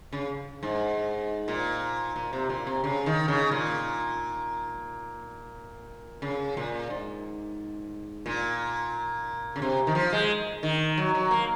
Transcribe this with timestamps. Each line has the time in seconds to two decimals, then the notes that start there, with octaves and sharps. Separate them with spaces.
0.13 C#3
0.63 G#2
1.48 A#2
2.16 A#2
2.33 C3
2.49 A#2
2.67 C3
2.84 C#3
3.06 D#3
3.28 C#3
3.51 A#2
6.22 C#3
6.57 A#2
6.90 G#2
8.26 A#2
9.56 C#3
9.62 C3
9.87 D#3
9.95 F3
10.13 G#3
10.63 D#3
10.97 F#3
11.15 F#3
11.31 A#3